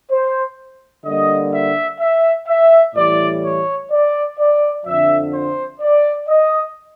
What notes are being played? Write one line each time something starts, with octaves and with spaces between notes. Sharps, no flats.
C5
D3 G3 A#3 D#5
E5
E5
E5
A2 E3 G3 D5
C#5
D5
D5
F2 D3 F3 E5
C5
D5
D#5